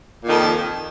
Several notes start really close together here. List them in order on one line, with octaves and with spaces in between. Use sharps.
A#2 D#3 F2